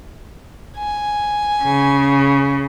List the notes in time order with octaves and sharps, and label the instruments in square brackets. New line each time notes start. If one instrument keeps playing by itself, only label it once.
[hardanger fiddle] G#5
[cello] C#3